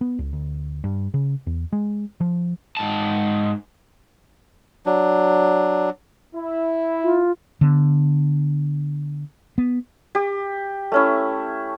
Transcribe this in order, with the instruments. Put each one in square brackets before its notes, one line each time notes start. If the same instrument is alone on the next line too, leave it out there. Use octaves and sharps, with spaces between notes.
[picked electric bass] B3
C#2
D2
G2
C#3
E2
G#3
F3
[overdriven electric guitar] G#2 A5
[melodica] F#3 D4
[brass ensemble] E4
[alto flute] F4
[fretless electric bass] D3 B3
B3
[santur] G4
A3 C#4 E4